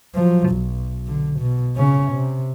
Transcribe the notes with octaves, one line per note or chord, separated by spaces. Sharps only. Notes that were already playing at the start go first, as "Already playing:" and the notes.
F3 F#3
B1
D3
B2
C#3 C#4
C3